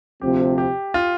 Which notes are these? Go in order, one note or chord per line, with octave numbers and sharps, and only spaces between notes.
D2 C3 F3 C4 G4
G4
F4